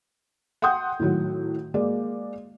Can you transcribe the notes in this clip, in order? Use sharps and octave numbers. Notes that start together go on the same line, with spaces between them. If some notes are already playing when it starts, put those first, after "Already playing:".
F#5 G5 C6 D#6 G6
A2 D#3 F#3 F#4
G#3 A#3 D5